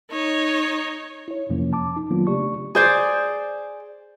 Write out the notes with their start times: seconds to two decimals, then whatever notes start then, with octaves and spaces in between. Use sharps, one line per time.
0.11 D#4 C#5
1.28 E4 C#5
1.49 F2 C3 F3 A#3 C#4
1.73 A5 D6
1.96 D#4
2.10 D#3 F#3 A#3 B3 D4 F4
2.27 C#3 A3 G4 D5 C#6
2.75 G#4 C5 D5